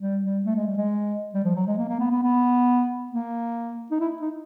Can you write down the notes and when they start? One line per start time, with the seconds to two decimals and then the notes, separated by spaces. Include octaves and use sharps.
0.01 G3
0.24 G3
0.46 A3
0.56 G#3
0.66 G3
0.77 G#3
1.34 G3
1.44 F3
1.55 F#3
1.67 G#3
1.78 A#3
1.89 A#3
2.00 B3
2.11 B3
2.23 B3
3.11 A#3
3.91 D#4
4.00 E4
4.22 D#4